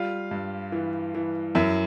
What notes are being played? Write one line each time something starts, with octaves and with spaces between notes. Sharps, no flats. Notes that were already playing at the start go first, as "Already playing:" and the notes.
Already playing: G3 F4 F5
G2
E3
E3
F#2 E4 E5